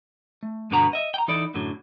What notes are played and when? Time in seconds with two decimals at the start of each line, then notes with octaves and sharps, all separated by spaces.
0.43 A3
0.71 G2 B2 D3 B3 F#4 A#5
0.93 D#5 E5
1.14 G5 A#5
1.28 E3 D#4 E4 A4 D5
1.54 F#2 A2 D3 F#3